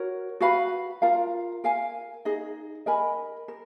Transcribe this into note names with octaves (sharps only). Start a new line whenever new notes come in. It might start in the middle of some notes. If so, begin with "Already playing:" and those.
Already playing: F#4 A#4 C#5
F#4 B4 F5 B5
F4 A#4 F5 A#5
A#4 F5 G#5
D#4 G#4 D#5
A#4 D#5 G#5 B5
A#4